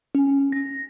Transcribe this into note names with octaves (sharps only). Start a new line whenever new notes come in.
C#4
A#6